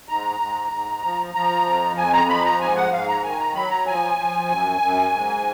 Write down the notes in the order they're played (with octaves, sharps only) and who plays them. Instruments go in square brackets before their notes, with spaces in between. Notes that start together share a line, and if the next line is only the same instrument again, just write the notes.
[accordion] G#2 A#5
G#2
G#2
F3
F3 A#5
F2
F2 G#5
A#5
F3 B5
A#5
G#2 G#5
F#5
G#2 F5
A#5
D#3 G#5
A#5
F#3 B5
A#5
F3 G#5
F3
F#2
F#2
G#2